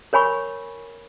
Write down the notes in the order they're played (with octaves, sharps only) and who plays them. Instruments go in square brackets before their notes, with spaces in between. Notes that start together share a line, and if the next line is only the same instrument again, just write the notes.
[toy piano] A#4 C#5 G#5 B5 C#6